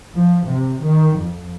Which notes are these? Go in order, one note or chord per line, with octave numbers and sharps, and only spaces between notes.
F3
C3
D#3
F2